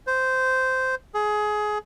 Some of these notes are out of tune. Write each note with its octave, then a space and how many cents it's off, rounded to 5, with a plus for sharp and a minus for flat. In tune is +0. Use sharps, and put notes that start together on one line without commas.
C5 -10
G#4 +20